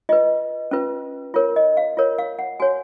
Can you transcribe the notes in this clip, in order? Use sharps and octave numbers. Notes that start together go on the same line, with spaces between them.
F4 B4 D#5
C#4 F4 B4
F4 A#4 C#5
D#5
F5
F4 A#4 C#5
F5
F#5
F#4 C#5 G#5